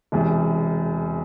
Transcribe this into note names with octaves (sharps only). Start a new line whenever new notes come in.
E1 E2 C3